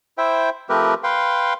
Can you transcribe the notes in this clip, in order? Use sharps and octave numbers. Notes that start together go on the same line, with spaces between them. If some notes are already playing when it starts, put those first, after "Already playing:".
E4 C5 E5 G5
F3 A3 C4 G4 A#4 B4
B4 F5 G5 C6